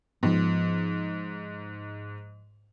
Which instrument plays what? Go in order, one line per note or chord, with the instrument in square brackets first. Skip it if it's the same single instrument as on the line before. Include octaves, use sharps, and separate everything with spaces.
[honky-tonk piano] G#2 [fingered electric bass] F3 B3